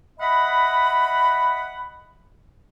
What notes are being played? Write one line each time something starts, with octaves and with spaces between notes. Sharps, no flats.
D#5 E5 F#5 B5